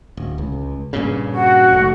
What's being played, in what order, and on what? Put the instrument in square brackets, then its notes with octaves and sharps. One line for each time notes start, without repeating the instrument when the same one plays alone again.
[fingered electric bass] D1
C#2
G2 A#2 C#3
[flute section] F#4
[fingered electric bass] F1 A3